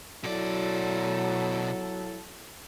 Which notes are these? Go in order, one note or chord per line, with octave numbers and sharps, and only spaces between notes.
B2 F#3 E4 A4 D5